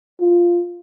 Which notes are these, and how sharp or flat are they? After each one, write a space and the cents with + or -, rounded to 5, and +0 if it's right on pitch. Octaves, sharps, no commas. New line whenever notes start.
F4 -5